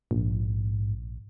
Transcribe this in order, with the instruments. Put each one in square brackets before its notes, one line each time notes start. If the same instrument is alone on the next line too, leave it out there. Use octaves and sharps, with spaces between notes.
[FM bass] A#1 [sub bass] G#2